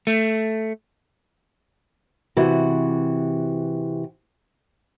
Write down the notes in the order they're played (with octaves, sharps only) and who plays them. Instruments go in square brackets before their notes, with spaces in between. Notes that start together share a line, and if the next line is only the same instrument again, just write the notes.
[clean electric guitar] A3
[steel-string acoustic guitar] C3 E3 F#4